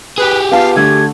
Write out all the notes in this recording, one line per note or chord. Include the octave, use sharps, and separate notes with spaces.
G4 G#4 B4
B3 F4 F5 A5
D3 A3 G#6